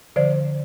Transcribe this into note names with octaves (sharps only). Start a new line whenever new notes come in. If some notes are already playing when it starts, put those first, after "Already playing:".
D3 F3 C5 D5